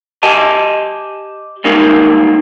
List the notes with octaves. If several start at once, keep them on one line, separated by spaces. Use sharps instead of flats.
G4 D#5 G#5 A5
G3 G#3 A#3 C#4 D#4